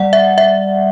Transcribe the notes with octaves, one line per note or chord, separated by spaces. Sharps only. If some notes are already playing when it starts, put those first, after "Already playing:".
Already playing: G3 D5 F#5
E5
E5